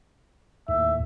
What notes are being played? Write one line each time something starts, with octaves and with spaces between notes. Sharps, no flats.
D#2 A2 E5